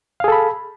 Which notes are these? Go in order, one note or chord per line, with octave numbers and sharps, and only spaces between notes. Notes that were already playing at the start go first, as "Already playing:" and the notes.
G#4 A4 F5 B5